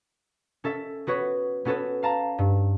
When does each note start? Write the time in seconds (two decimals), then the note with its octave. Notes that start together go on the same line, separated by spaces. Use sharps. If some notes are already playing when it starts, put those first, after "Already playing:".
0.64 C#4 A4 E5
1.07 B3 F#4 B4 C#5
1.65 B3 C#4 F#4 A4 B4 C#5
2.03 F5 A5 A#5
2.38 G2